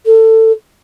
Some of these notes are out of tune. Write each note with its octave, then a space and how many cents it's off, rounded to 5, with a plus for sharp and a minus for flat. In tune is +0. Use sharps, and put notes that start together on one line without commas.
A4 +20